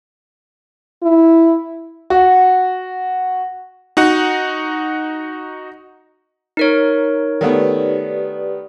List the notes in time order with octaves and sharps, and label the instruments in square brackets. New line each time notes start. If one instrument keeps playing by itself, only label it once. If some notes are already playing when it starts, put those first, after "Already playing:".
[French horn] E4
[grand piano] F#4
[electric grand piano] D#4 F#4 F#5
[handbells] D#4 A#4 C#5
[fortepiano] D#3 A3 B3 [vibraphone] G4 B4 D5